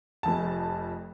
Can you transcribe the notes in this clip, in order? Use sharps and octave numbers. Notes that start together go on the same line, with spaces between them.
F1 F2 A5